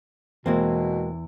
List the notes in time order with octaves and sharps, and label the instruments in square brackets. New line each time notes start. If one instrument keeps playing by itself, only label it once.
[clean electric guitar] E2 E3 [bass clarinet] B2 [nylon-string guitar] G#3 A#3 C4